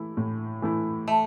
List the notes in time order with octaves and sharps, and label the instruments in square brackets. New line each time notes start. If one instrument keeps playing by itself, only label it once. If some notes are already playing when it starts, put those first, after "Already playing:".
Already playing: [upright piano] E3 A3 E4
A2
E3 A3 E4
[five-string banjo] A3